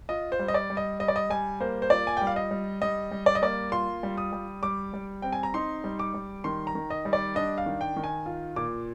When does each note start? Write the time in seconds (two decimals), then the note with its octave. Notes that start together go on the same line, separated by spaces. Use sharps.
0.09 F4 D#5
0.32 C5
0.39 G3
0.48 D#5
0.54 D5
0.70 G3
0.77 D#5
1.00 G3 D#5
1.08 D5
1.16 D#5
1.30 G3 G#5
1.60 A#3 C5
1.82 C5
1.90 F4 D5
2.07 G#5
2.17 G3 G5
2.27 F5
2.36 D#5
2.51 G3
2.82 G3 D#5
3.11 G3
3.26 D5
3.35 D#5
3.42 A#3 D5
3.72 F4 C6
4.03 G3
4.17 D#6
4.33 G3
4.63 G3 D6
4.94 G3
5.22 C4 G5
5.32 G#5
5.43 A#5
5.54 D#4 C6
5.84 G3
5.99 D6
6.14 G3
6.44 D#3 C6
6.67 A#5
6.75 D#3
6.90 D#5
7.05 G3
7.13 D5
7.35 D4 D#5
7.58 F5
7.66 D#3
7.81 G5
7.96 D#3
8.04 G#5
8.26 F4
8.56 A#2 D6